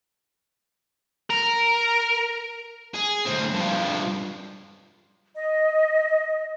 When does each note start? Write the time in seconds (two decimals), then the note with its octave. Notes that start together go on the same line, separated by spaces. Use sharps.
1.30 A#4
2.94 G#4
3.25 D2 C4
3.53 G2 F3
5.35 D#5